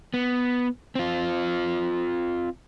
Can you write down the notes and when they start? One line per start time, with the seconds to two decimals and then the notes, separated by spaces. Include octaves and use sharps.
0.14 B3
0.95 C4 F4